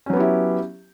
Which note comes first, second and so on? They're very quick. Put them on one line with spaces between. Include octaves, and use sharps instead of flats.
C#4 F#3 B3 G4 E4